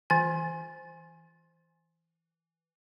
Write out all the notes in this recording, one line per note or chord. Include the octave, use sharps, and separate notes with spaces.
E3 G#5